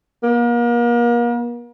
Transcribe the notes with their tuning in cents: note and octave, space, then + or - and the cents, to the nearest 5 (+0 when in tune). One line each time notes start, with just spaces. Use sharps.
A#3 +40